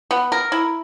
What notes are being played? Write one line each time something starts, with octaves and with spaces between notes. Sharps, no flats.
B3
A#4
E4